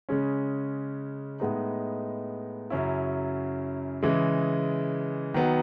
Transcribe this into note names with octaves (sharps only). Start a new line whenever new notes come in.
C#3 G#3 C#4
A2 G#3 B3 D#4
F#2 C#3 F#3 C#4 E4
C#3 E3 G#3
D#3 F#3 B3